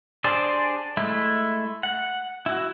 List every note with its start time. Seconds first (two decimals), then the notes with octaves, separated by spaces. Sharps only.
0.24 D4 G4 G#4 C5 D5
0.97 G#3 A3 E4
1.83 F#5
2.46 E4 F#4